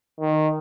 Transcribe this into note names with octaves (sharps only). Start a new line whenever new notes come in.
D#3